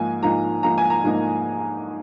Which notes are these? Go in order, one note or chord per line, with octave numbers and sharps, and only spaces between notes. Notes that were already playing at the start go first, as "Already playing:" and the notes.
Already playing: G#2 F3 A#3 D#4 G#5
G#2 F3 A#3 D#4 A#5
G#2 F3 A#3 D#4 A#5
G#5
A#5
G#2 F3 A#3 D#4